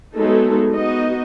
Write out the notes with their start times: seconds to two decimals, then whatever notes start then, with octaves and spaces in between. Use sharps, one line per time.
0.14 F#3 G#3 A3 B3 D#4 A4
0.73 B3 D#4 F#4 D#5